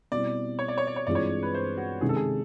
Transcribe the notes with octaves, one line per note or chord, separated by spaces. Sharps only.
B2 G3 C4 E4 D5
C#5
D5
C#5
D5
C#5
G2 E3 G#3 C4 F4 D5
C#5
B4
C5
F#4
C3 D#3 G#3 C#4 G#4
A4
G#4